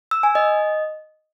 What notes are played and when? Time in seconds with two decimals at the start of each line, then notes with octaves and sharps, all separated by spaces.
0.11 E6
0.23 G#5
0.35 D#5